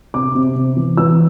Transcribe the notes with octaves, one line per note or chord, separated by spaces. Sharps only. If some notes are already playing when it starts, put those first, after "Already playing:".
C3 D6
C3
C3
E3
E3 E6